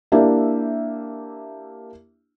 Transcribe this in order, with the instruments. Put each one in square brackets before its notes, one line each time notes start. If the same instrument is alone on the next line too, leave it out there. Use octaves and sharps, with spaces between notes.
[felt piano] A#3 D4 E4 G4 E5